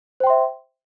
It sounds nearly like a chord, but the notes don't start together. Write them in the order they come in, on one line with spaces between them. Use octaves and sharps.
C5 G5 C6 E5